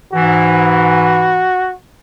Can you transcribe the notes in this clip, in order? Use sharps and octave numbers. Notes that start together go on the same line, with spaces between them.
G#2 E3 F#4